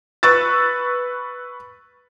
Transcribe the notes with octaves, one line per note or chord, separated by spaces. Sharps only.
B4 C#6 E6 A6